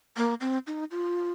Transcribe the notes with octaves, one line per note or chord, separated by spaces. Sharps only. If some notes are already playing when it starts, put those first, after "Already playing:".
A#3
C4
D#4
F4